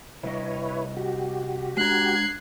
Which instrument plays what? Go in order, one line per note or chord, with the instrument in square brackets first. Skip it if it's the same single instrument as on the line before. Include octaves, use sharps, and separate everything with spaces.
[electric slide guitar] C3 G3 D#5 [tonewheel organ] E4 B4 C#5
[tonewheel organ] F#4 G4
[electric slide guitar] G#3 D4 A#5 [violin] F#6 G#6 [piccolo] C7